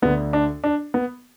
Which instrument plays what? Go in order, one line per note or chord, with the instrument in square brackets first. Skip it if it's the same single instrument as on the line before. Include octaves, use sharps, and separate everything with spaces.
[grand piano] D2 D3 B3
D4
D4
B3